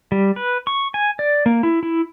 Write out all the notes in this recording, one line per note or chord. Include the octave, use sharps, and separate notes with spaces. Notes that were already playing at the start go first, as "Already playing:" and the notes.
G3
B4
C#6
G#5
D5
A#3
E4
E4